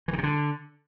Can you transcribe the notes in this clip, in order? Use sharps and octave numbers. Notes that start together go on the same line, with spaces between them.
E3
D#3
C3
D3